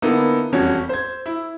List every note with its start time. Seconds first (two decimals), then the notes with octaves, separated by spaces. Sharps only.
0.02 D3 A#3 B3 D#4 E4
0.52 E1 F2 G3 C#4 F#4
0.89 C5 G#6
1.26 E4